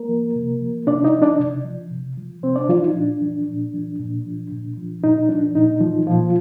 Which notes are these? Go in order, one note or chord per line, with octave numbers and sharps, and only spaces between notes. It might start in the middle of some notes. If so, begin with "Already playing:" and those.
Already playing: A#3 A#4
F3
C3
F3
C3 D4 D5
D#4 D#5
F3
D4 D5
C3
F3
C3
F3
C3 C4 C5
D4 D5
F3 F4
D#4
A#2 D4
F3
A#2
F3
A#2
F3
A#2
F3
A#2 D#4
F3 D4
A#2 D#4
F3
A#2 F3 F4